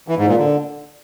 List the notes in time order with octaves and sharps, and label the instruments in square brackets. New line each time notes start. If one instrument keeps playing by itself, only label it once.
[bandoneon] E3
G#2
A#2
D3